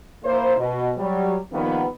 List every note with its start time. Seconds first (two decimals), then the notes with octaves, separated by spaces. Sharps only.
0.24 A#3 E4 C5
0.57 B2
0.97 F#3 G3
1.52 D#3 F3 G3 A#3 B3